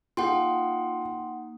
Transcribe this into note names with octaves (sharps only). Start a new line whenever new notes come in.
A#3 D#4 F4 G#4 F#5 G5 C6